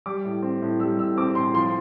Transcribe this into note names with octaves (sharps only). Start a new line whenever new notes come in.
G3 D6
A2
C4
A2
G3 E6
A2 E6
C4 D6
A2 C6
F3 C6